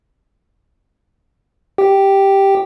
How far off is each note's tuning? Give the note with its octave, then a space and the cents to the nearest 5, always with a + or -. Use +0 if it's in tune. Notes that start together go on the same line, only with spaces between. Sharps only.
G4 +0 G5 -5